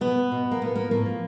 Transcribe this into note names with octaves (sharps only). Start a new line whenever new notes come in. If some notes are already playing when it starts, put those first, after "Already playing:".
B2 B3
B2
A#3
A2 B3
F3 A#3
A2 A#3
F3